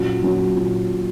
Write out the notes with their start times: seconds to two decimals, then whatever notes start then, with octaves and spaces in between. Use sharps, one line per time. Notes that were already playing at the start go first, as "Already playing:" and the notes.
Already playing: A#2 F#3 C#4 F#4
0.23 A#2 F#3 C#4 F#4
0.56 A#2